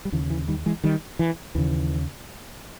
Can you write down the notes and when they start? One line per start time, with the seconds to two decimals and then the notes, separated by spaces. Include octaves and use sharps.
0.05 G3
0.12 D#2 C#3 E3
0.30 E3
0.48 D#3 G3
0.66 E3 G#3
0.84 D#3 G3
1.19 E3
1.55 D#2 C#3 E3